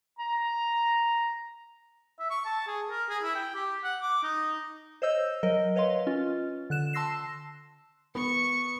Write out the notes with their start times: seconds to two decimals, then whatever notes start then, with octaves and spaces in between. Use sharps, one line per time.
0.19 A#5
2.19 E5
2.30 C#6
2.45 A5
2.67 G#4
2.90 A#4
3.09 G#4
3.23 E4
3.35 G5
3.55 G4
3.84 F#5
4.02 D6
4.23 D#4
5.02 C5 C#5 D#5 E6 G6
5.43 F#3 A#4 D#5
5.76 B4 C#5 D#5 F5 C6
6.07 C#4 F4
6.70 D3 F#6 E7
6.93 A5 C6 E6 A#6 C7 E7
8.15 B3 C#6